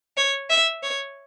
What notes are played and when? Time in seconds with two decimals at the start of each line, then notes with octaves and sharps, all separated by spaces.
0.17 C#5
0.50 E5
0.83 C#5